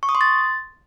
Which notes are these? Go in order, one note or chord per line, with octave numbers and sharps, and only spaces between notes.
C#6
D#6
C6
A6